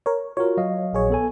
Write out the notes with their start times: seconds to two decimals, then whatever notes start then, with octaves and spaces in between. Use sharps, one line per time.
0.06 A#4 C#5
0.37 F4 F#4 A#4 C#5
0.57 F#3 D#5 F5
0.93 A#1 G#4 C#5
1.10 B3 A4 G#5